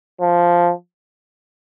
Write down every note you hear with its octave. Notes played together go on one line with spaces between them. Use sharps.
F3